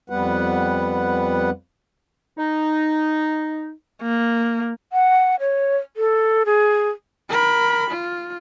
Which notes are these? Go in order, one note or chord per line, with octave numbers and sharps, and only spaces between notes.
F2 G3 B3 B4 F#5
D#4
A#3
F#5
C#5
A4
G#4
A#4 B5
F4